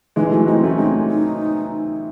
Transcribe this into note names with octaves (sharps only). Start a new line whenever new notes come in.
E3 G#3 D#4
G#3
F#3 A3 E4
C4 D#4 E4
A3 C#4 F#4
G#3 C4 D#4
D#4